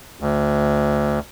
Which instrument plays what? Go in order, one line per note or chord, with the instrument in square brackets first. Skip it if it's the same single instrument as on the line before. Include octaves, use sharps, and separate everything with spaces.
[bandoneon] D2